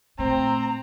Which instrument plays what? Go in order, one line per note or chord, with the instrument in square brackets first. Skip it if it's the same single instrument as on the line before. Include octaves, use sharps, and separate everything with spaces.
[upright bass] A#2 A3 [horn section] C4 [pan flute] C5 [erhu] A#5